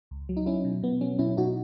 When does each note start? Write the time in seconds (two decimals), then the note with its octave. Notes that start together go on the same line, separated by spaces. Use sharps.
0.11 C#2
0.29 F#3
0.37 D#4
0.46 F#3 C#4 E4
0.64 B2
0.83 B2 B3
1.01 F#3 C#4
1.19 B2 C#4 E4
1.37 B2 D#4 F#4